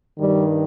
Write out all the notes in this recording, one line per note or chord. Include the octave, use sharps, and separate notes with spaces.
G2 D#3 G3